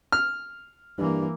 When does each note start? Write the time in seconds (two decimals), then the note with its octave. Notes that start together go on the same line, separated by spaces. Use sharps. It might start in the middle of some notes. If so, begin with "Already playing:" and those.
0.12 F6
0.98 G2 E3 A#3